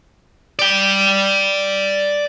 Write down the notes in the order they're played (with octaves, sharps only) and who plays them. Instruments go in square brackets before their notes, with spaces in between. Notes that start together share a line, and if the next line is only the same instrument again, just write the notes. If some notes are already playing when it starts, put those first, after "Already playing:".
[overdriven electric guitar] D5 G5